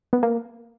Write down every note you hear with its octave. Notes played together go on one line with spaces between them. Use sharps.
B3
A#3